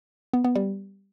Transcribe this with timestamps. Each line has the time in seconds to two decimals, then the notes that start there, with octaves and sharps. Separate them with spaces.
0.33 B3
0.44 B3
0.55 G3